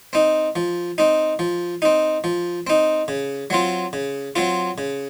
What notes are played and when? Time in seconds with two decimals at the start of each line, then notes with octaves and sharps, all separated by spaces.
0.13 C4 D#4
0.56 F3
0.98 C4 D#4
1.39 F3
1.82 C4 D#4
2.24 F3
2.67 C4 D#4
3.08 C#3
3.50 F#3 C4 F4
3.93 C#3
4.36 F#3 C4 F4
4.78 C#3